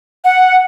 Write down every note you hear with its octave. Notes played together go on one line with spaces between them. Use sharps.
F#5